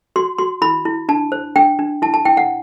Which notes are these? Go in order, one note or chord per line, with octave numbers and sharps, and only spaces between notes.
F#4 C6
F#4 C6
E4 B5
E4
D4 A5
C5
D4 G5
D4
E4 A5
A5
E4 G5
F#5